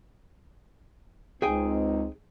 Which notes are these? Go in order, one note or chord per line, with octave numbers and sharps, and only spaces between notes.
C#2 C4 D#4 G#4 G5 G#5